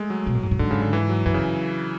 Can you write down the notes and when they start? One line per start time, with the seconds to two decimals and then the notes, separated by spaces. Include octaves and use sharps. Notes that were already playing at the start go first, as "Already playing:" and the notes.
Already playing: G#3 A3
0.10 F#3
0.26 B2
0.35 A2
0.43 G#2
0.51 A2
0.59 G#2 D3
0.71 C#3
0.82 D3
0.93 E3
1.09 F#3
1.26 F#2 E3
1.34 C#3